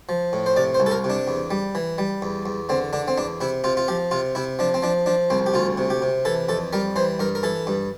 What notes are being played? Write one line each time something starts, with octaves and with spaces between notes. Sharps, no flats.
F3
A2
C5
C3 D5
C5
C2
A4
A#4
C3
D4
E2
G3
E3
G3
E2
E2
D3 C4
D3 D4
C4
E2 D4
C3 E4
C3 F4
F4
F3 G4
C3 F4
C3 E4
F3 D4
C4
F3 D4
F3 D4
C2 C4
G4
D2 F4
C3
G4
C3
E3 A4
F2 A4
G3 A#4
E3 C5
G2 A#4
A#4
E3 A4
G2